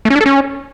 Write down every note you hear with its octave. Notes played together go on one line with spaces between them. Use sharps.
A3
C#4
D4
A4
C#4